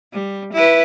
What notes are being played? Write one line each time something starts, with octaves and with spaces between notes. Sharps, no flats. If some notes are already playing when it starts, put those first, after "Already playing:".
G3
E4 B4